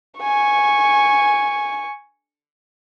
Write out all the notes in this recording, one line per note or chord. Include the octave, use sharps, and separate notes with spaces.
G#5 C#6